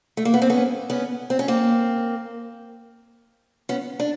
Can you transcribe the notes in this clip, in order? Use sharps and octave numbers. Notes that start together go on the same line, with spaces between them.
A3
A#3
B3
C4
B3 C#4
B3 C#4
C4
C#4
A#3 C4
B3 C#4
D4